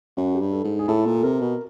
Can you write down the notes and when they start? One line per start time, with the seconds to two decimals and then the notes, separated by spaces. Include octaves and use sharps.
0.17 F#2 F#4
0.35 G4
0.40 G2
0.52 A4
0.64 G#2
0.79 G#4
0.88 A2 A4
1.06 A#2
1.16 A4
1.23 C3 A#4
1.41 B2